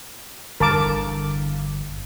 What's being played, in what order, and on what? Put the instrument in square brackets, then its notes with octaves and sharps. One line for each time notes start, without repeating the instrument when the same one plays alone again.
[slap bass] G1 E2 [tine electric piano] D3 F5 [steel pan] A#4 A5 D6